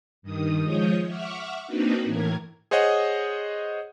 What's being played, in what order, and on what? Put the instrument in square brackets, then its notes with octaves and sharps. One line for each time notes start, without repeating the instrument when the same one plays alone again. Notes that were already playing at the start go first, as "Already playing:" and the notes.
[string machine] G2 D#3 D#6
F3 G#3 C#5 D#6 G6
E5 F#5 C#6 D6 F6
A#3 C4 D4 D#4 F#4 B4
A2 E3 A#4 G#6
[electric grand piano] G#4 C5 C#5 D#5 F#5